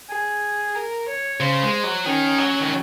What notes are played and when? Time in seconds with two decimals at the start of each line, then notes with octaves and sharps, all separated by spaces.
0.10 G#4
0.76 A#4
1.08 C#5
1.40 C#3 C5
1.62 G#3
1.83 F#3
2.06 D#3 C#4
2.38 F#3
2.61 D#3